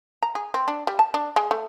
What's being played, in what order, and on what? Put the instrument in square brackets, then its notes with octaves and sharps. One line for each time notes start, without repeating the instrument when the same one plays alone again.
[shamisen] A#5
G#4
C4
D4
G3
A5
D4
G#3
A3